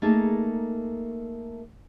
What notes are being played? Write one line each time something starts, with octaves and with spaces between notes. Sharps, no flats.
A3 A#3 D#4 G#4 A4